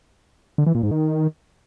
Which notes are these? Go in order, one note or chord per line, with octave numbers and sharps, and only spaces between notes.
D3
E3
A#2
G#2
D#3